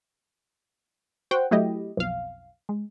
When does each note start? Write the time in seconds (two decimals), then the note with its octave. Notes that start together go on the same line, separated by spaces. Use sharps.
1.31 F#4 C5 F#5 G5
1.51 F#3 A3 E4 G4 D#5
1.97 B1 F2 F5
2.69 G#3